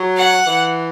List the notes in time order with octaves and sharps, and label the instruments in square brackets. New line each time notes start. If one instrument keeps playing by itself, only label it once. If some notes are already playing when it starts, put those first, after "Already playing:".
Already playing: [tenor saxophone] F#3
[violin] F#5
[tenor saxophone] E3